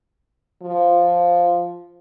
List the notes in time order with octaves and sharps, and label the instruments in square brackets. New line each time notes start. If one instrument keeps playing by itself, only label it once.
[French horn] F3